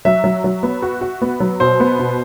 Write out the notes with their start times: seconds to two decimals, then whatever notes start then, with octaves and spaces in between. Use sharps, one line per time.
0.05 F#3 E5
0.24 F#3
0.44 F#3
0.63 B3
0.82 F#4
1.01 F#4
1.21 B3
1.40 F#3
1.60 B2 C5
1.80 B3
1.99 B2